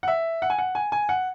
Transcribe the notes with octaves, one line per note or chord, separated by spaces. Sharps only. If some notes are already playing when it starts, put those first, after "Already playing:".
F#5
E5
F#5
G#5
F#5
G#5
G#5
F#5